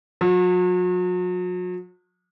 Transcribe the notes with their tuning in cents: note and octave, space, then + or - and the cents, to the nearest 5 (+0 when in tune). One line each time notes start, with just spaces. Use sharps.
F#3 -40